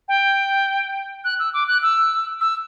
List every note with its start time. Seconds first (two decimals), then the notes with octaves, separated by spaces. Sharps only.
0.08 G5
1.25 F#6
1.39 E6
1.54 D6
1.68 F#6
1.83 E6
2.41 E6